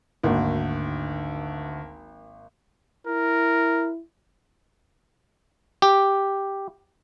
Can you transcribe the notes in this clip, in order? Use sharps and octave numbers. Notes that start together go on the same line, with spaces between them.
G#1 D2 A#3 F#4
E4 A#4
G4